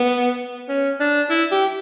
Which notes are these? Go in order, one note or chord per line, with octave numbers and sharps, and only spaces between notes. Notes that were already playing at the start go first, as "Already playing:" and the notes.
Already playing: B3
C#4
D4
E4
G4